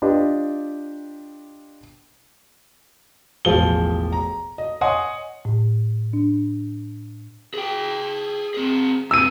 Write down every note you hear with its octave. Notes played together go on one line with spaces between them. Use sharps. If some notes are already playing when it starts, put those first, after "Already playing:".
D4 F4 G4 B4 D#5
E1 A1 F3 G#4 G7
A#5
D#5
C#5 D#5 F#5 G#5 C6 D#6
A2
D4
G#4 G5
C4 G#4
G2 C3 E6 D#7